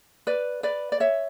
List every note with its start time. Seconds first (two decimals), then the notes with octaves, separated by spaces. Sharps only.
0.27 B4 D5
0.63 B4 D5
0.92 D5
1.00 C#5 E5